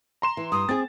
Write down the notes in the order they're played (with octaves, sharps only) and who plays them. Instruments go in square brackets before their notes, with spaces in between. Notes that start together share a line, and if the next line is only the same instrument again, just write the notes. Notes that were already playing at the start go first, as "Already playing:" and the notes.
[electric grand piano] A#5 C6 E7
[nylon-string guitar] E3
[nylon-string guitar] G2 [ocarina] D#6
[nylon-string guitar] C4 G#4 [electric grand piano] A6